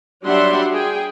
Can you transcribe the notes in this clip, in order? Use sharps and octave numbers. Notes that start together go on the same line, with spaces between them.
F#3 G3 D4 E5 F#5 C6
G#4 G5